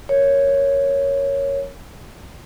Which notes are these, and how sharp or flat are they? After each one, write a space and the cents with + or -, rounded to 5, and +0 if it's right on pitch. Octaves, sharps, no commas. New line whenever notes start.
A#4 -5 C#5 +0